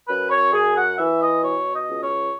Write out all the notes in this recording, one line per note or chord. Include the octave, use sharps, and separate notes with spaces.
F#2 B4
C#5
F#2 G#4
F#5
E3 E5
D#5
B2 C#5
D#5
C#2
C#5